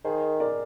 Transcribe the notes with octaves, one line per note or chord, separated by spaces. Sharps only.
D#3 G#4 C5
A#4 D5